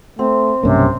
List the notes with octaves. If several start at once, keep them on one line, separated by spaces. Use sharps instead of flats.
A3 C4
B1 G2 C3 A#3 C#4